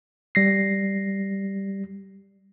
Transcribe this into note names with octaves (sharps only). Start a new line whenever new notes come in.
G3 A#6 C7